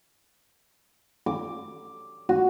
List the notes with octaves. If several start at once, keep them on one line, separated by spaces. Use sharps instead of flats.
D6
F#4